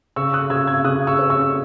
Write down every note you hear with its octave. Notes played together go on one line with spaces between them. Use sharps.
C#3 C#6 E6
D#6 F#6
C#3 E6 G#6
E6 G#6
C#3 D#6 F#6
C#6 E6
C#4
C#6 E6